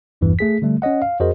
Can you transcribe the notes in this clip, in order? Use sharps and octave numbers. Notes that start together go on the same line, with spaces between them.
A1 E2 G2 E3
A3 G#4 B6
D3 G3 A3
C#4 C#5 D#5 F#5
F5
F2 F#4 G#4 A#4 C5 D#5